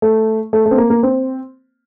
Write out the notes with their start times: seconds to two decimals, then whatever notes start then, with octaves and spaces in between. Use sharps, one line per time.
0.02 A3
0.53 A3
0.66 A3
0.71 C4
0.78 A#3
0.90 A#3
1.03 C4